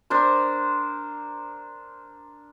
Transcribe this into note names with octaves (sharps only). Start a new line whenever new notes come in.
D4 A#4 C5